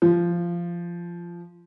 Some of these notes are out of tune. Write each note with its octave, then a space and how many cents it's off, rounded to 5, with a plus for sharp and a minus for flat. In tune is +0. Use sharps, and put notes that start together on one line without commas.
F3 -15